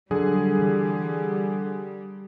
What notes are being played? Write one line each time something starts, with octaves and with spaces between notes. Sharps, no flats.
D3 F#3 G3 G#4
E3